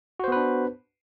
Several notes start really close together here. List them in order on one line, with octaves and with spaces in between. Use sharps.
F#4 C5 B3 B4 D4